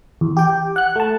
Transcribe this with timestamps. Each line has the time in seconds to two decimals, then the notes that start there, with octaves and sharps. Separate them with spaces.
0.21 E2
0.37 G4 G5
0.76 F#5 F#6
0.96 A3 A5